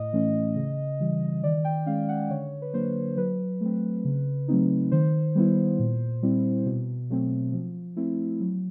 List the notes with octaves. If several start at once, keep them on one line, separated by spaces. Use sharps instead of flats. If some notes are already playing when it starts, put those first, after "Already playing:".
Already playing: A2 D#5
E3 A3 C#4
C#3
E3 G3
D#3 D5
G5
G#3 C#4 F5
F#5
D3 C#5
B4
F#3 A#3 D4 C5
F#3 B4
A3 C4
C#3
F#3 A3 C4 D#4
D#3 C5
G3 B3 E4
A#2
G3 C4 E4
B2
F#3 A3 C4
F3
A3 C4 E4
F#3